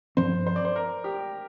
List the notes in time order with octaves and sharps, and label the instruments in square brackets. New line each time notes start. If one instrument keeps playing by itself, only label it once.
[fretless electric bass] G2 F3 C4 [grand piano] C5
[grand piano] C5
D5
C5
A#4
G4